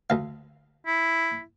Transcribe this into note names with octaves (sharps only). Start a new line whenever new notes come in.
D2 F5
E4